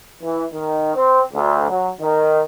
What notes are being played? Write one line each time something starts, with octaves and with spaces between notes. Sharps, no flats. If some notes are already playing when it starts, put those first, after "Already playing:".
E3
D#3
C4
D2
F#3
D#3